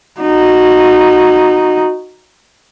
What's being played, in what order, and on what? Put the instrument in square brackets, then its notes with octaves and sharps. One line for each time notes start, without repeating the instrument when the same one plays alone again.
[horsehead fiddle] D#4 F#4